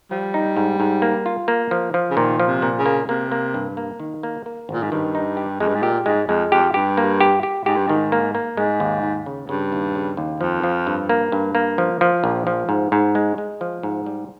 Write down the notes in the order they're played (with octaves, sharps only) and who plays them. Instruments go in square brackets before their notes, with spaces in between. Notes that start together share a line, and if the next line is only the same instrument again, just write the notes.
[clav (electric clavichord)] F3 [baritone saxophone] G3
[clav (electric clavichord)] D#4
G#2
G#2
A#3
F4
A#3
F3
F3
[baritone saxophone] C#3
[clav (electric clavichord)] A#2 [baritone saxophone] D#3
[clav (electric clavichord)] F3
[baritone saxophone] C3
[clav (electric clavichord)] A#2
[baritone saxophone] C#3
[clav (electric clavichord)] A#3
[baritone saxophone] C3 [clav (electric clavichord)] A#3
[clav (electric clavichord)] A#3
G2
A#3
D#3
A#3
A#3
[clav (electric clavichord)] G#1 [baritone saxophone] A#2
[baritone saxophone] G#2
[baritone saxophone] G2 [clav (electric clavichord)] D#3
[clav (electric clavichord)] D#4
G4
[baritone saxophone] F2 [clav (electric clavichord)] G#3
[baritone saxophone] G2
G#2
[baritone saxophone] A#2 [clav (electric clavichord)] G4
[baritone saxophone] G#2 [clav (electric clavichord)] G#3
[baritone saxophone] F2 [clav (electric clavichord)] G#3
[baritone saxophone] F2 [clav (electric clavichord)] G4
[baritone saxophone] G2 [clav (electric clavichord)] G4
[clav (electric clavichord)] A#3
G4
G4
[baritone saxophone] G#2 [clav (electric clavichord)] G4
[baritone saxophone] G2
[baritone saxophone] G#2 [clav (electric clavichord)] D#3
[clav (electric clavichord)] A#3
A#3
[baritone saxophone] G#2 [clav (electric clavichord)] G#3
[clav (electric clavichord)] D#2
D#2
C#3
[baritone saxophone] G2 [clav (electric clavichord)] C#3
[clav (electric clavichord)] D#2
C#3
D#2
[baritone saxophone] F2 [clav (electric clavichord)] F3
[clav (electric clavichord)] F3
G2
A#3
G2
A#3
F3
F3
A#1
F3
G#2
G#2
G#3
G#3
F3
G#2
G3